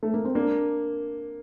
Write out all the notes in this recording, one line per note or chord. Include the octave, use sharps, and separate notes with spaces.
A3
A#3
C4
A#3 D4